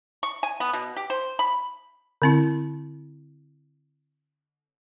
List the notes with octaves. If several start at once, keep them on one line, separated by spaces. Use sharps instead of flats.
C#6
G#5
B3
B2
G4
C5
B5
D3 C4 E4